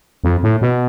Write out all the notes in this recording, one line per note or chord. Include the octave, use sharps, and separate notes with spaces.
F2
A2
B2